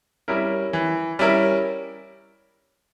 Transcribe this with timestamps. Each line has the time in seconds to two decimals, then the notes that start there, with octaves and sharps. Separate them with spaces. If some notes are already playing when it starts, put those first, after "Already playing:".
0.28 G3 C#4 E4 A#4
0.73 E3
1.19 G3 C#4 E4 A#4